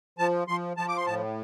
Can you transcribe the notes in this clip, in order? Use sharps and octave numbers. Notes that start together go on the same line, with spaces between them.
F3 A5
F3 C6
F3 A5
D6
C6
A2 A5